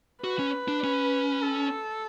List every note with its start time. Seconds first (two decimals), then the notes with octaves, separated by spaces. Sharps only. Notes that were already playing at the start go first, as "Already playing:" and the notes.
0.24 F#4 B4
0.39 C#4
0.68 D4
0.84 C#4
1.42 A4